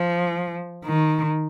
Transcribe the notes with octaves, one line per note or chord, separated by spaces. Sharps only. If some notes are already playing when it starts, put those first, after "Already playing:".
Already playing: F3
D#3